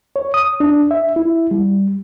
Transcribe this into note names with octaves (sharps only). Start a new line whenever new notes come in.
C#5
D#6
D4
E5
E4
G3